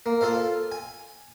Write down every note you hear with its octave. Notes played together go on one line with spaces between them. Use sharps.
A#3
F4 A4 C5 F5
G#5